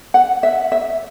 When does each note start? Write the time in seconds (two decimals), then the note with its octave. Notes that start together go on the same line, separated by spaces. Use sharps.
0.14 F#5
0.43 E5
0.72 E5